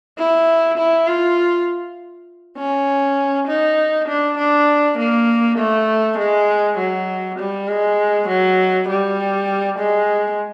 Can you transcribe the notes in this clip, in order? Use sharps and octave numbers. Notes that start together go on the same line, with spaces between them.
E4
E4
F4
C#4
D#4
D4
D4
A#3
A3
G#3
F#3
G3
G#3
F#3
G3
G#3